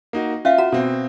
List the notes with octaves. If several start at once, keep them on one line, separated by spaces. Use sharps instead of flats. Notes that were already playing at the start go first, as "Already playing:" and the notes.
A#3 D#4 F#4
C#4 F4 E5 F5
F#4 F#5 A#5
B2 C4